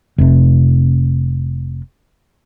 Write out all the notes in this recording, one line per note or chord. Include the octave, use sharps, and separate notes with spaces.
F1 C3